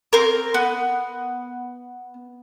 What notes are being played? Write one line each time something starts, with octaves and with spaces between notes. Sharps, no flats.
C4 A#4
B3